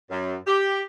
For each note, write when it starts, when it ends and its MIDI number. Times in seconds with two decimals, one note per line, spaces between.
0.11 0.35 42
0.47 0.81 67